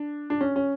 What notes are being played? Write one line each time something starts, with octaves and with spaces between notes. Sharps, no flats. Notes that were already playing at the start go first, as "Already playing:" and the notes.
Already playing: D4
D4
C#4
C#4